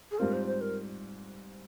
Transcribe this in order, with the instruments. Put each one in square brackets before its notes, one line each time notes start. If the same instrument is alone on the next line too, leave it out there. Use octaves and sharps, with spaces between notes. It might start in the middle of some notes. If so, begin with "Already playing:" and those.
[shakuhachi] G#4
[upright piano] G#2 G3 C4 F4 [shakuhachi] A#4
[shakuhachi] C5
C5
A#4